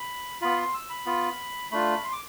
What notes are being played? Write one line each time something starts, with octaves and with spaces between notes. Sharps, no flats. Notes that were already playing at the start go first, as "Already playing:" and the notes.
Already playing: B5
B3 F4 B5
C6
E6
B5
B3 F4
A3 D4 F4 B5
C6
D6